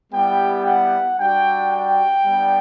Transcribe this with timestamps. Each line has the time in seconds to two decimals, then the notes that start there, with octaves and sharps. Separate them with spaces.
0.13 G3 B3 E4 G4 G5
0.66 F#5
1.19 G3 D4 F#4 G5
1.73 G5
2.26 G3 B3 D4